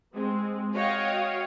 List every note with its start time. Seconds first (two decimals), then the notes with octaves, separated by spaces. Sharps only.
0.13 G#3 C4
0.73 F#4 C#5 D#5 F5 G5